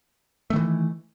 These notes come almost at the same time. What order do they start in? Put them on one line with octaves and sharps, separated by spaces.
A3 D#3 E3